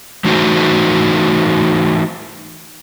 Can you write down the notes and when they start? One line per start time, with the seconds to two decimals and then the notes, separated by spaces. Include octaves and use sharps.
0.25 E3 A3 D#4 F#4 C5